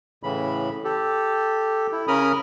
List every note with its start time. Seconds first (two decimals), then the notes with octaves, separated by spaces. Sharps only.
0.23 A2 C#3 E3 B5
0.84 G4 A4
1.92 E4
2.08 C#3 C#4 A#4 B5 D#6 F6